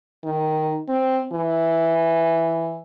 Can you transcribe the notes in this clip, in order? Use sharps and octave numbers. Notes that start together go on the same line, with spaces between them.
D#3
C4
E3